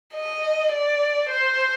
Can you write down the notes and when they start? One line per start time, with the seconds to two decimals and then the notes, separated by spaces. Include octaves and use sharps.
0.15 D#5
0.72 D5
1.30 C5